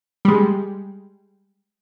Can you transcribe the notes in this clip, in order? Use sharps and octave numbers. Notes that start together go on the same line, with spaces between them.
G3 G#3